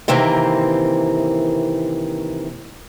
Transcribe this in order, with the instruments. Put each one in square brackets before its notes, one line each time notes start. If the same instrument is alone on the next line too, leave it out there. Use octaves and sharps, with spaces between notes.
[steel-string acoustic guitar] C3 D#3 E3 A#3 C4